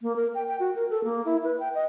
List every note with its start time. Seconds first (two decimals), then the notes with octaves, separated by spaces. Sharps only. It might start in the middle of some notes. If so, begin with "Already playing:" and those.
0.02 A#3
0.16 A#4
0.35 G5
0.48 G5
0.60 F#4
0.76 A#4
0.90 A4
1.04 A#3
1.25 E4
1.44 B4
1.60 G5
1.75 D#5